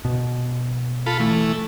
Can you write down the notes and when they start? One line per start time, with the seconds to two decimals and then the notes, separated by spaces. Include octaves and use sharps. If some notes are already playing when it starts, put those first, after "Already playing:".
0.05 B2
1.06 F4 A4 B5
1.20 E3 A3